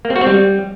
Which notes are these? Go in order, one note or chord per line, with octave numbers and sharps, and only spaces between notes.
A#3
C4
F#4
C4
G3